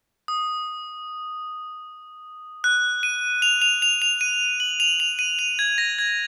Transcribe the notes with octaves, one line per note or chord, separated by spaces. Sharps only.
D#6
F#6
D#7
F7
F7
F7
F7
D#7
F#7
F7
F7
D#7
F7
G#6
A#6
G#6